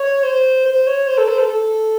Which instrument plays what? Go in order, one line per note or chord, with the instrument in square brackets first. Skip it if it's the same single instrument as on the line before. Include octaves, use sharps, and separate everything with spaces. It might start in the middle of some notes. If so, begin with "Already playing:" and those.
Already playing: [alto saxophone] C#5
C5
C5
C#5
C5
A4
C5
A4
A4